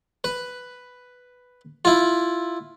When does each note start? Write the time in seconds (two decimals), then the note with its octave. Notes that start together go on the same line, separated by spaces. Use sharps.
0.24 B4
1.85 E4 F4